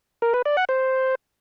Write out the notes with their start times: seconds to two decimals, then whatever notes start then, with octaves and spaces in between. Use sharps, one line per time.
0.22 A#4
0.34 B4
0.45 D5
0.57 F#5
0.69 C5